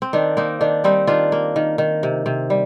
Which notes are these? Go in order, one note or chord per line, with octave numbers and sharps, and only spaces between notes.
C4
D#3 D4
A#3 C4 D#4
D#3 D4
G3 C4 D#4
D#3 D4 F4
A#3
D#3
D#3
C3
C3
G3